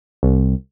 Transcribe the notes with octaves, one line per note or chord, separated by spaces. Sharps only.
C2